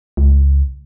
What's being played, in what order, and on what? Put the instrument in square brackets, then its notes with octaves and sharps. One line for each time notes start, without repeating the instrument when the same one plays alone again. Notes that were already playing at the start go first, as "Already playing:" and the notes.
[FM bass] C#2